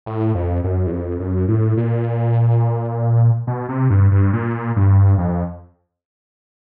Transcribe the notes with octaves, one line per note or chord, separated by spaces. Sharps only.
A2
F2
F#2
E2
F2
F#2
A2
A#2
B2
C3
G2
G2
A#2
G2
F2